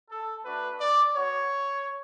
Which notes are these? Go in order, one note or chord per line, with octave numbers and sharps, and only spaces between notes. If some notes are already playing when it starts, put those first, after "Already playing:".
A4
A3 D4 F#4 B4
D5
B3 F#4 C#5